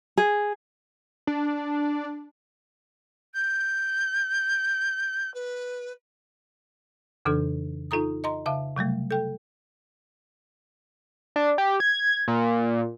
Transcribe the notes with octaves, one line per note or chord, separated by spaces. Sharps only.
G#4
D4
G6
B4
F2 C#3 E3 D4 A4
D#4 F4 A4 A#5 D#6
D#5 A#5 C6
C#3 E5 F5 A5
C3 F#3 G3 A3
A4 G5
D4
G4
G#6
A#2